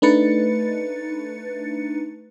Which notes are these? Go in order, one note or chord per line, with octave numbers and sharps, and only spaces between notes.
A3 D4 D#4 B4 A6 C#7